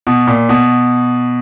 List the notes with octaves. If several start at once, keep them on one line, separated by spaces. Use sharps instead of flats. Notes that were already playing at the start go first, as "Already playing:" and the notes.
B2
A#2
B2